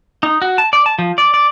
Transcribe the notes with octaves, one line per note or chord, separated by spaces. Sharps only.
D#4
F#4
A5
D5
A5
F3
D5
D5